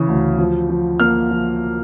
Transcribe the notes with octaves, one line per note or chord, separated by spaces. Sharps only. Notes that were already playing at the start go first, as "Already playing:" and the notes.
Already playing: C#3 E3
D2
F3
F3
A#3 F6
F3